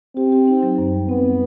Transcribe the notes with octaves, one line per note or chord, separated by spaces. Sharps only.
C4 G4
G4
D#4
F#3
F#2
G3
B3 C4
G3